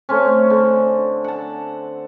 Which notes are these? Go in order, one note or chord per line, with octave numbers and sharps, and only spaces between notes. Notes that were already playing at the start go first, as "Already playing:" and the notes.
A3 C4 C#4
D3
F#5 A5